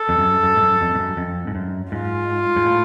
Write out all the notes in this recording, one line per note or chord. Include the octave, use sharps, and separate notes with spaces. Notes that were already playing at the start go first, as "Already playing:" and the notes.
Already playing: A4
F2
F#2
F#2
G#2
F#2
F2
G#2
F#2
F2
G#2
F#2
G#2 F4
G#2
A2